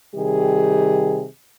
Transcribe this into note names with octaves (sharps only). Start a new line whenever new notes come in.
C3 D#3 G3 G4 G#4